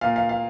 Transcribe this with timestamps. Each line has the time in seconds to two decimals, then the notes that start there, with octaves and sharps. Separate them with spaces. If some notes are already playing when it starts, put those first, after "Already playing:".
0.01 A#2 F5
0.16 F5
0.29 F5